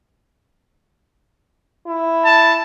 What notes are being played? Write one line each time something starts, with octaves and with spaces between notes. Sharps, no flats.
E4
A5